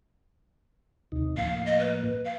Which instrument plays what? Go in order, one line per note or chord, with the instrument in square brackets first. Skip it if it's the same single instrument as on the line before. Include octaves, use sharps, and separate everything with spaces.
[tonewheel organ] D#2 C3 D#4
[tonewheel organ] A2 F3 A#3 [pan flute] F5
[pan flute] D#5
B4
F5